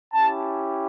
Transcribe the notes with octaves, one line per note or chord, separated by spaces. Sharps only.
C#4 E4 G4 A5